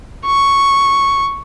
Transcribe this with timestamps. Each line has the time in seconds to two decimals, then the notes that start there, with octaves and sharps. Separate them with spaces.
0.27 C#6